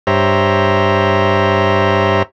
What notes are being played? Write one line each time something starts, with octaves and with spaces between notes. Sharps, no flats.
G2 G4 C5 C#5 E5 A#5